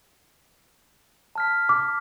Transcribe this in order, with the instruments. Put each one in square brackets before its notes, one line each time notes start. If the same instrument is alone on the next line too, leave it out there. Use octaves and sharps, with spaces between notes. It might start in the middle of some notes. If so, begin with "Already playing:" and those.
[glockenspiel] A5 F6 B6
[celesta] D6